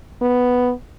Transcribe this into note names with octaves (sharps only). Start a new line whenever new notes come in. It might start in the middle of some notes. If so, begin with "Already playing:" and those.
B3